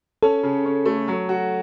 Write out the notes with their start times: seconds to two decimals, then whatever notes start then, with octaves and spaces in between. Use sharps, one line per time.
0.23 C#4 A4
0.43 C#3
0.65 C#4
0.85 A3
1.08 F#3
1.29 F#4